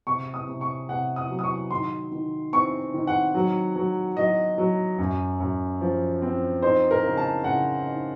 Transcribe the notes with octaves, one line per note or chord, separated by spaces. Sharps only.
C3 C#6
D#6
C3
C#6
C3 F#5
D#6
F#3
D#6
C#6
D#3 C6
D#3
C4 C#6
D#3
F#5
F#3
F#3
F#3 D#5
F#3
F#2
F#2
F3
C4
D#4 C5
A#4
C#3
A5
C#3 F#5
D#4